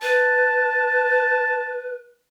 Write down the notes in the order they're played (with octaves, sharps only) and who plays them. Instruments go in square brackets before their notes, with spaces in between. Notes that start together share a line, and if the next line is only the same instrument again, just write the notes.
[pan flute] B4 [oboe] A5